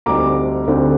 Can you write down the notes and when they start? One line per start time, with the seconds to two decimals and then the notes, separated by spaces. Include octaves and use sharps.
0.06 D2 D3 G3 C4 D#4 A#5 D6
0.67 D2 D3 G3 C4 D#4